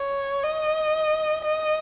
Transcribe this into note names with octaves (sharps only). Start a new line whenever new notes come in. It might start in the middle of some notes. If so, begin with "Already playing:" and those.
Already playing: C#5
D#5
D#5